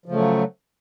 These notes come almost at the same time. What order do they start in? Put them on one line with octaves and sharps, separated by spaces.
F3 C#3 A3 F#3